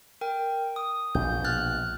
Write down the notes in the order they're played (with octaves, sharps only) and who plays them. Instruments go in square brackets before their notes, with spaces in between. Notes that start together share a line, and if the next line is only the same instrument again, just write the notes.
[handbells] A#4 G5
D#6
[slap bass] A#1 B2 [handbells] G6
[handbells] F6 F#6 A6